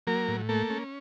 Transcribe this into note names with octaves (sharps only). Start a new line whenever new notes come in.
F#3 A#3 A#4
A2
A3 A#3 A4
C#4